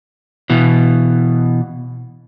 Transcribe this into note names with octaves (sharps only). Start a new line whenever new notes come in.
B2 E3